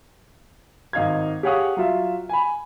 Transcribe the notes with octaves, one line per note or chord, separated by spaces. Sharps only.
G#1 D#4 F5 G#6
G4 G#4 C#5 F5 F#5 D#6
F#3 F4 E5
G#5 B5